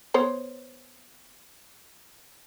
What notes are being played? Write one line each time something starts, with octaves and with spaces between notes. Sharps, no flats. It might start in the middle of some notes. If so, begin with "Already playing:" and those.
B3 C5 C#5